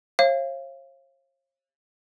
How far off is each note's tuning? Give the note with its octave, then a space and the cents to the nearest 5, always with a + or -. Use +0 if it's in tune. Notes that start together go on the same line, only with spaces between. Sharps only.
C#5 -45 F5 -25